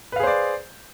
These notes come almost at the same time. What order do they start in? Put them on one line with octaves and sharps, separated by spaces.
B4 F5 G#4 C5 D5